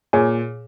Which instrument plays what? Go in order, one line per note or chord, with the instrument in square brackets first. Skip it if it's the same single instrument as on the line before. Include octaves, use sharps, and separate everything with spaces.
[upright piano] A#2 [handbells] G#4 C#5 G#5